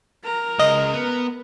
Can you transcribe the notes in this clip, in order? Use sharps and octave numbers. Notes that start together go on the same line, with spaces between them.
A#4 A#5
C#3 G#3 D#5
B3